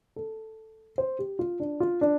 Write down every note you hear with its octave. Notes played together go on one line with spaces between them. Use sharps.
A4
C5
G4
F4
D4
F4
D4